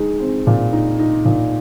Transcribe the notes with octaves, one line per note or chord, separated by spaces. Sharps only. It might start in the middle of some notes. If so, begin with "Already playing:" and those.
Already playing: G#3 D#4
C4
A#2
D#4
D#4
A#2